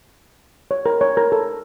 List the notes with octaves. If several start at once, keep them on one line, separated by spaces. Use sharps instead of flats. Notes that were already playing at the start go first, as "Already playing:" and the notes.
C#5
A#4
C#5
A#4
A4